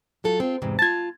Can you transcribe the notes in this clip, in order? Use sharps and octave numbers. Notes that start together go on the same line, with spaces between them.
F#3 F4 A4
C4 F4
E2 G#2 C3
F4 A5 G#6 A6